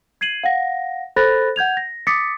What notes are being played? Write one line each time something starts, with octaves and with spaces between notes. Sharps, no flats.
G#6 C7 D#7 F#7
F5 F#5 A#6
A4 C5 B5 F#6 A6 A#6
F#5 G6 G#6 F7
A#6
D6 D#6 A6 B6 C#7